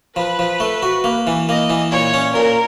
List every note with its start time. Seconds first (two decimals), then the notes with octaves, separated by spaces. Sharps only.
0.16 F3 B4
0.39 F3
0.60 A3
0.83 F#4
1.04 A#3
1.27 E3
1.49 A#3 D#5
1.70 E3
1.92 A#2 C#5
2.14 C#4
2.36 A#2 A#4